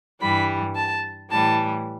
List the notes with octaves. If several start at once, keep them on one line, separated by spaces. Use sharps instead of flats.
G2 E3 G3 B5
A5
A2 E3 G3 A5